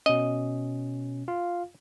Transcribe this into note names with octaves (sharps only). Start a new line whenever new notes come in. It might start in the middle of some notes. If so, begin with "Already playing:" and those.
B2 C#4 D#5
F4 F5